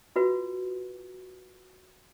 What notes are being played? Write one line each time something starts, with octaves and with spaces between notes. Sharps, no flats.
F4 F#4 B4